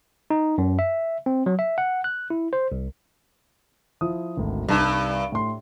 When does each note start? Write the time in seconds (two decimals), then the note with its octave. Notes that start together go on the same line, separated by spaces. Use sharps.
0.30 D#4
0.58 F#2
0.79 E5
1.26 C4
1.46 F#3
1.59 E5
1.78 F#5
2.04 F#6
2.30 E4
2.53 C5
2.72 C2
4.01 F3 E4 D#6
4.37 G#1 D2
4.68 C2 G2 D#4 A5
5.32 A2 C6